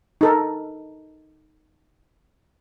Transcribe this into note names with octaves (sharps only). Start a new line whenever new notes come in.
D#4 A4 A#4